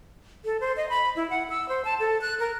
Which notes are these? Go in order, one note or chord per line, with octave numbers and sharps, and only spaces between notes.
A4
C5
D#5
B5
E4
F#5
E6
C5
A5
A4
F#6
A#4